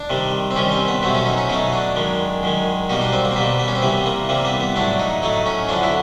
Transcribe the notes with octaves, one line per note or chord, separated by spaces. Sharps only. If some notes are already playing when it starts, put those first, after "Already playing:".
Already playing: D4
C3 D#3 G3
C4
C3 D#3 G3 C#4
C4
B3
B2 F#3 A3 C4
C#4
D#4
C#4
B2 F#3 A3 D#4
D4
F#2 D#3 G#3
F#2 D#3 G#3
B2 G3 A#3 D#4
D4
C4
A#3
C4
B2 G3 A#3 B3
B3
C#4
C4
C3 E3 G3 B3
A#3
C3 E3 G3 A#3
B3
B3
A2 F#3 A3 D4
D#4
A2 F#3 A3 D#4
C#4
F2 D3 F#3 D4
E4